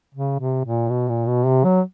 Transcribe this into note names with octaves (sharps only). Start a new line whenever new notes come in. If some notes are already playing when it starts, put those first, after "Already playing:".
C#3
C3
A#2
B2
A#2
B2
C3
F#3